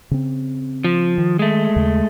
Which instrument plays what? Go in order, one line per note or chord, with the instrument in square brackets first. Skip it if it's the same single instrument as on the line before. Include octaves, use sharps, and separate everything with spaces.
[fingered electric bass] C#3 C4
[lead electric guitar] F3
[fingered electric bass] D#3
[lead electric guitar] G#3 A3
[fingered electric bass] D#2 C#3